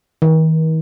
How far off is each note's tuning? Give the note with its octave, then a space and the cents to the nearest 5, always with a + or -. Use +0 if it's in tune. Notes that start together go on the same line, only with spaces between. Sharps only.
D#3 +45